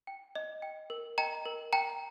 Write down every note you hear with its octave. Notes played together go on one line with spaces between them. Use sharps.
G5
D#5
G5
A#4
D#5 G5 A#5
A#4
G5 A#5